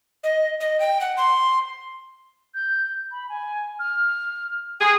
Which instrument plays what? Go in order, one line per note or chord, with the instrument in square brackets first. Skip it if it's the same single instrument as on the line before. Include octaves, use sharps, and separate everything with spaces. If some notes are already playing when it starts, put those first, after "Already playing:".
[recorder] D#5
D#5
G5
F#5
C6
[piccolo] G6
B5
G#5
F6
[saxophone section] G#4 [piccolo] G5